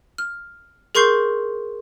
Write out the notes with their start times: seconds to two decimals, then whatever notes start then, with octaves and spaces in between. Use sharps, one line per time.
0.18 F6
0.95 G#4 A#4 C6 C#6 G6 C7